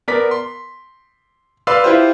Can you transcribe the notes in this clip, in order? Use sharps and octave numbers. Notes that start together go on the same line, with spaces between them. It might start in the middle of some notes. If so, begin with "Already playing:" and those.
B3 A#4 D5 B6
C6
B4 D5 F5 C6 E6
E4 F4 G4 C5